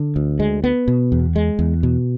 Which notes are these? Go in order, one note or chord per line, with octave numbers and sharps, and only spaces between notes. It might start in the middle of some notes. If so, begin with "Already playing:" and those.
Already playing: D3
D2
G#3
B3
B2
E2
G#3
E2
B2